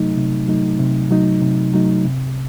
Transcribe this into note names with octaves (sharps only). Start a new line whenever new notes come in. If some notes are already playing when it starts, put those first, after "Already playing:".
Already playing: C3 F#3 A3 D#4
C3
F#3 A3 D#4
C3
F#3 A3 D#4
C3
F#3 A3 D#4
C3